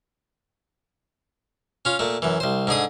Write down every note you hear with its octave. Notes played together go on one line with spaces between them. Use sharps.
C#4 F4
A#2 A3
F#2 E3
C2 C5
G#2 D3 G#4 D#6